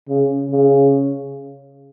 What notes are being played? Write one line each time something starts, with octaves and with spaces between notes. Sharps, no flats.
C#3
C#3